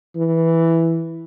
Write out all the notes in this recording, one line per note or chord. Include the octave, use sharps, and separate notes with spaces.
E3